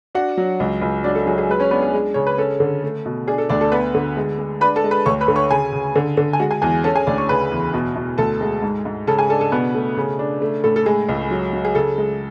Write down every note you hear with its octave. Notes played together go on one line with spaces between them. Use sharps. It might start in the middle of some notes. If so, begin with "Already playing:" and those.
D4 F#4 F#5
F#3
C#2
C#2
F#3 D4 D5
A4
F#3 G#4
G#4
G#3 B4
C#4 C#5
B3 D4 B4
G#4
G#3
C#3 C#5
B4
C#4 A4
D3
A3
B2
D4 G#4
A4
D2 D4 D5
A4 A5
B3 B4 B5
D3
G#3
G#3
D4 B4 B5
A4 A5
G#3
B4 B5
D2 C#5 C#6
B4 B5
D3
C#5 C#6
C#3 G#4 G#5
C#3
D3
D3
G#5
G#3 F#4 F#5
G#4 G#5
E2 G#4 G#5
C#4 A4 A5
G#4 G#5
D2 D4 D5
C#5 C#6
C#3 B4 B5
E2
B2
B2
D2 A4 A5
G#3
G#2
G#2
C#3 A4 A5
G#4 G#5
D4 A4 A5
A4 A5
B2 B3 B4
A3
C#3
D4
A3
A2 A4
A4
G#3 G#4
C#2
F#3
F#3
G#4
C#3 A4
G#3